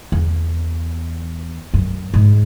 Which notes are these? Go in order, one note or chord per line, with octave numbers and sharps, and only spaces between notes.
E2
F#2
G#2